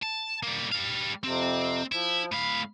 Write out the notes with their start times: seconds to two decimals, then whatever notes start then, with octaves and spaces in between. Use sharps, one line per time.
0.03 A5
0.43 G3 A#3
0.72 G3 F5
1.24 F2 C3 C4
1.92 F3 E4
2.32 A2 F5 B5